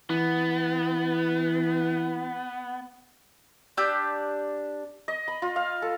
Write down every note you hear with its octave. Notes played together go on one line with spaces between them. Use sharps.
E3 B3
D4 G4 E6 G6
D#5
B5
F4
F5
A4